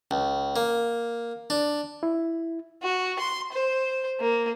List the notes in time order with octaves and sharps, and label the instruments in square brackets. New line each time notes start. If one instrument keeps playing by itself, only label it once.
[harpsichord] C#2
A#3
D4
[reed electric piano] E4
[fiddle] F#4
C6
C5
A#3